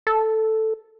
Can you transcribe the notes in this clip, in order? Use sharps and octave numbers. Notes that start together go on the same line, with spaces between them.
A4